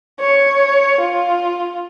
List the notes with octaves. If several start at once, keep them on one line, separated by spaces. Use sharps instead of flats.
C#5
F4